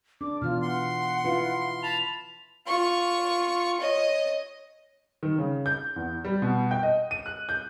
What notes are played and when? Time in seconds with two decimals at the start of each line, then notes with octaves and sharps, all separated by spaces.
0.21 D4 D6
0.42 B2 E3 F4 F6
0.62 F#5 C6
1.24 E4 F4 B4
1.83 A5 B5 F7
2.67 F4 C#6
3.80 C#5 D#5
5.23 D#3
5.38 C#3
5.66 G6
5.96 E2
6.24 G3
6.42 B2
6.71 G5
6.83 D#5
7.11 D#7
7.26 F#6
7.49 G6